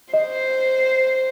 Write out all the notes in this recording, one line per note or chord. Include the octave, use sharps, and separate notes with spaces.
C5 D#5